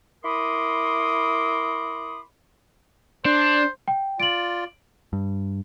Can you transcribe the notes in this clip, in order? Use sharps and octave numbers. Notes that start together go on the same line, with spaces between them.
E4 A#4 B5 C6 D6 D#6
D4 C5
G5
F4 D5 D7 F#7
G2